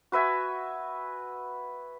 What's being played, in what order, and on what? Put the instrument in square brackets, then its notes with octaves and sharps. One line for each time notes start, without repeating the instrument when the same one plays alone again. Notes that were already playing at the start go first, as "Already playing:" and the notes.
[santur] F#4 B4 E5 G#5